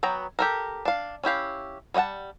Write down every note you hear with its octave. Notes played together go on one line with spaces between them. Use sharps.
F#3 B3 G5 A#5
G4 A4 A#4
D4 F5
C#4 E4 G4 F5
G3 C#5 D#5 F#5 A5